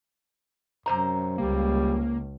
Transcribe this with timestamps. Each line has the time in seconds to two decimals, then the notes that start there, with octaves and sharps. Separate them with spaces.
0.86 F#2 C3 C5 A#5
1.38 C#2 G3 A#3